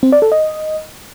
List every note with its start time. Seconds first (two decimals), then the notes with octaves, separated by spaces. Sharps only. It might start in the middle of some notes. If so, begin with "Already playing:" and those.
0.03 C4
0.12 D5
0.22 A4
0.32 D#5